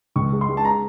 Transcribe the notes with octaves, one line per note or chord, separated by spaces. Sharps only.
C#2 C#6
G#3
C6
G#3
A5
A#5